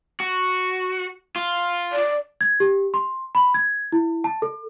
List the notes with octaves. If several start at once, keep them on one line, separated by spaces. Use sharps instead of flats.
F#4
F4
D5
G#6
G4
C6
B5
G#6
E4
A5
A4